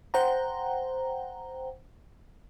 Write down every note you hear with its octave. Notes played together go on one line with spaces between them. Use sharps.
C5 F#5 G5 A#5